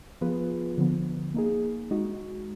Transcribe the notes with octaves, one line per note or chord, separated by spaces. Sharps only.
F3 B3 F4 G#4 B4
D3 F3 B3
A#3 D#4 G#4
G#3 D#4 F#4